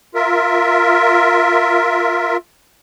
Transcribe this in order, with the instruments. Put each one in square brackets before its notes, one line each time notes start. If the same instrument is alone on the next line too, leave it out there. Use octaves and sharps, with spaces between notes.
[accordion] F4 A#4 E5